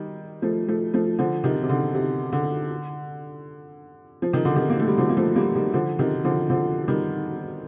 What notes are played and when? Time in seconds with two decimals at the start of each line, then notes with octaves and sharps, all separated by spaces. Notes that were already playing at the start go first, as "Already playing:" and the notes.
Already playing: D#3 G3
0.42 F3 A3
0.68 F3 A3
0.94 F3 A3
1.19 D3 F3
1.44 C3 D#3
1.63 C3
1.69 D3
1.95 C3
2.33 D3
4.22 F3
4.33 D#3
4.45 D3
4.56 C3 D#3
4.69 A#3
4.79 A3
4.88 G3
4.98 D3 F3
5.09 A#3
5.17 F3 A3
5.35 G3 A#3
5.55 D#3 G3
5.74 D3 F3
5.99 C3 D#3
6.24 D3 F3
6.50 D3 F3
6.88 D#3 G3